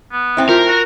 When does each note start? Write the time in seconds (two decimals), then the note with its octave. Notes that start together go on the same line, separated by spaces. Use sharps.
0.12 B3
0.37 A2 C4 E4
0.49 F4 G4 A#4
0.67 F#4